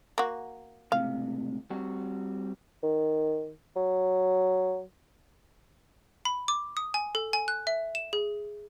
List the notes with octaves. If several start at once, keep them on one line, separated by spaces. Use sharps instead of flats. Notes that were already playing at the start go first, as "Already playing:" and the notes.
A#3 F#4
C#2 A2 C3 F5
G3 C4 F#4
D#3
F#3
B5
D6
D#6
G#5
A4
G#5
F#6
E5
E7
G#4